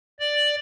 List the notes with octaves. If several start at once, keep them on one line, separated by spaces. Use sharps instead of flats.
D5